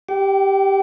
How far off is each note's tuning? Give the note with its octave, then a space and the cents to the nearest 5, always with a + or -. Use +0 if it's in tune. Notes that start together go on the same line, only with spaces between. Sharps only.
G4 +0 G5 -35